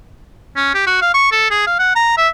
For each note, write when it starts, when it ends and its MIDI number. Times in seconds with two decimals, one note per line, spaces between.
0.56 0.71 61
0.74 0.84 67
0.87 0.99 66
1.02 1.12 77
1.14 1.30 85
1.32 1.49 69
1.51 1.64 68
1.67 1.79 77
1.79 1.93 78
1.96 2.17 82
2.18 2.29 76